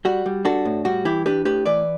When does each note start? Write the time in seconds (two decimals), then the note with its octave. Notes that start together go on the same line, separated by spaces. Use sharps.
0.05 G3 F#4
0.26 G3
0.45 D4 F#4 A4
0.65 A2
0.85 G3 F#4
1.05 E3 E4 G4
1.26 D4 G4 B4
1.45 A2 G4 B4
1.66 E3 B4 D5